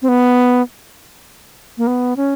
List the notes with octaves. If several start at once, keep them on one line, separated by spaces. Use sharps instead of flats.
C4
B3
A#3
B3
C#4